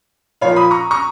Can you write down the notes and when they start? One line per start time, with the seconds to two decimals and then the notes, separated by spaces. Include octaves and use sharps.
0.41 A#2 F3 A#3 C#5 F5
0.56 B5 D#6
0.71 A#5 C#6
0.91 A#5 C#6